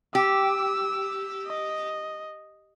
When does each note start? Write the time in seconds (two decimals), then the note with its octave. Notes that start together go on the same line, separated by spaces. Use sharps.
0.15 G4 E6
1.46 D#5